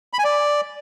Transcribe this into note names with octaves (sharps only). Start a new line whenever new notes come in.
B5
G#5
D5